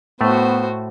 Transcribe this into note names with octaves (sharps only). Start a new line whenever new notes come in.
A2 A3 B3 F#4 C5